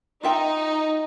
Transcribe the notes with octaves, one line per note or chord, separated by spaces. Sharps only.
D#4 F4 E5 G5